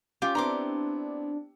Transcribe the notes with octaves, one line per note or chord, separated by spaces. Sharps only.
C#4 F4 G4
B3 C4 D4 E4 A#5 C6 D6